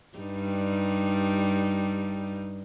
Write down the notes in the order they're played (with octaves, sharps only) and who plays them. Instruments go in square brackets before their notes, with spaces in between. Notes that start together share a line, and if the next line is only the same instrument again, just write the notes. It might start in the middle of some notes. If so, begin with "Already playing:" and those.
[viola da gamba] G2 G3 D#4